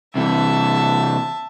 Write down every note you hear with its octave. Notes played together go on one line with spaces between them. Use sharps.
C3 E3 E5 A5